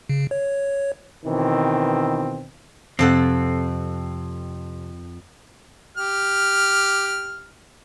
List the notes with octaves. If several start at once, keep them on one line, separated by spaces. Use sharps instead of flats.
C#3
C#5
B2 D#3 E3 C4
F2 C3 C4 A4 F#5
G4 F6